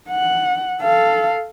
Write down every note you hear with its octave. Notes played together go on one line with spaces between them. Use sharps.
F#5
A4 F5